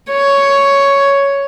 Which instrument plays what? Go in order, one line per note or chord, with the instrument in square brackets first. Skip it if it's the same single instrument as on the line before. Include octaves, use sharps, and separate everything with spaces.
[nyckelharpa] C#5